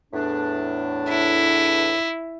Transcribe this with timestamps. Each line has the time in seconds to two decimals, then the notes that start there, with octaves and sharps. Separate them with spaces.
0.13 E2 A2 D4
1.09 E4